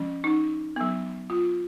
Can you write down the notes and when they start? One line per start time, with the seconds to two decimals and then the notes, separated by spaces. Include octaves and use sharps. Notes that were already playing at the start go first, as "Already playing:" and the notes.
Already playing: F3 G#3 C#4
0.24 D#4
0.76 F#3 B3
1.30 F4